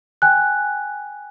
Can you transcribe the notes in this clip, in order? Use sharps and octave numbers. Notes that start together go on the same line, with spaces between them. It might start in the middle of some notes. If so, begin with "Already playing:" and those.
G5 G#5 F#6